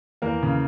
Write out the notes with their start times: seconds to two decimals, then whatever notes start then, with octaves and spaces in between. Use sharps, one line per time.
0.22 E2 A#3 A#4
0.43 C#3